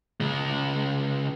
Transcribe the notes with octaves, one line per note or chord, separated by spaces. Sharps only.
C#2 G#3